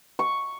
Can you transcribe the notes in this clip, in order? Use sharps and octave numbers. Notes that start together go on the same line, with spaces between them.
C#6